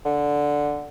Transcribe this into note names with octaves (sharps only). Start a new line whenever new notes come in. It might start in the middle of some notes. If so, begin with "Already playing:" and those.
D3